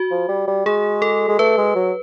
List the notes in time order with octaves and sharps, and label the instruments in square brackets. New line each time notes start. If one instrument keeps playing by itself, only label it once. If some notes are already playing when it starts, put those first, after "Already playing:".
Already playing: [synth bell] F#4
[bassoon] F3
G3
G3
[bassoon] G#3 [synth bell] G#4
[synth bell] A4
[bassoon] G#3
[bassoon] A3 [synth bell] B4
[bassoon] G#3
F#3